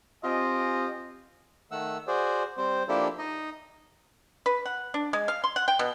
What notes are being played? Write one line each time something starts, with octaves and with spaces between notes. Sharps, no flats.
C4 F4 G4 D#5 G#5
D#3 A3 F#5 E6
F#4 G#4 C5 D5
G3 C4 C5
F3 A#3 D4 E4 G4 A4
D#4 D#5
B4
F#5
D4
G#3
F5
C6
F#5
G5
B2